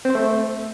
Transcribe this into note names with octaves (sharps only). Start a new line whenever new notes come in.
C4
C5
A3